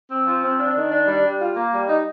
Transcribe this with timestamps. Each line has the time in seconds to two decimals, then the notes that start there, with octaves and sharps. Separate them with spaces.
0.10 C4
0.26 F3
0.43 C4
0.59 D4
0.76 D#3
0.91 D4
1.08 G3
1.24 G3
1.40 F4
1.56 A#3
1.73 G3
1.88 D#4